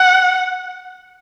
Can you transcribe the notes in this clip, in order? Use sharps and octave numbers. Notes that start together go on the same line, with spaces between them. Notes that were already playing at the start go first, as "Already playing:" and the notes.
Already playing: F#5